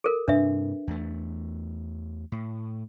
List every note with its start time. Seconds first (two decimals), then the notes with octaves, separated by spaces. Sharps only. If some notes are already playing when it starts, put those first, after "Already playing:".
0.04 A4 A#4
0.28 G2 C3 D4 B4 E5
0.87 E2 A3
2.32 A2